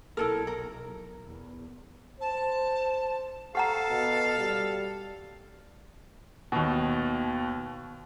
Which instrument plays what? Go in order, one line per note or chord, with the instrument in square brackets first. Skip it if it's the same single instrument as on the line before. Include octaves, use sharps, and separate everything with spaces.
[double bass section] B1 [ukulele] E4 A4 A#4
[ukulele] A#4
[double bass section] E2
[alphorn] C5 [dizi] A5
[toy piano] G4 F#5 A#5 [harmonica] A4 F5
[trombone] B2
G3
[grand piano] D#2 B2